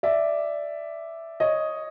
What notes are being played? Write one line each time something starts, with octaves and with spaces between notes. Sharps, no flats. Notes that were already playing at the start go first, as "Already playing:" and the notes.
D5 E5
C#5 D#5